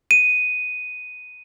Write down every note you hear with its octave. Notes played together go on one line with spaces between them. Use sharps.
D#7